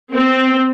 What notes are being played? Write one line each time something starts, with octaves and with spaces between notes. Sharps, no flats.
C4